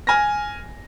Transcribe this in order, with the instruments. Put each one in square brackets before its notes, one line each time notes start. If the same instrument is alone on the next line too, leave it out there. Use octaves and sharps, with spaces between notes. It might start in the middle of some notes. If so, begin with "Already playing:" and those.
[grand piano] G#5 F6 A#6